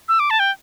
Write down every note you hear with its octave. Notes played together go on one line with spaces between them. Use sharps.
E6
D6
A5
G5